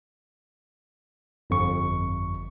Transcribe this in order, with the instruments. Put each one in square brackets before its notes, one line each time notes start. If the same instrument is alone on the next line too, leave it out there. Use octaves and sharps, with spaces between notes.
[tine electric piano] G1 F2 C#6